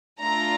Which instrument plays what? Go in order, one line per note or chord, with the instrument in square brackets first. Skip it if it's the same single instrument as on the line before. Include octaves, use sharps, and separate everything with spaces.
[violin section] A3 D4 F4 A4 A#5